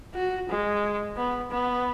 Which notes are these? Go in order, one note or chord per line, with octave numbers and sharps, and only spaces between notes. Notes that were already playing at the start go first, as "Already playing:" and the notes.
F#4
G#3
B3
B3